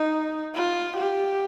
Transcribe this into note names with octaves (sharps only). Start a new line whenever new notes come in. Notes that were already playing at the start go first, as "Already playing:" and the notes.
Already playing: D#4
F4
G4